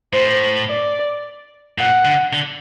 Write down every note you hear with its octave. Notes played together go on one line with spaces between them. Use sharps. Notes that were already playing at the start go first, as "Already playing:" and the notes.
A2 C5
D5
A#2 F#5
D3
D3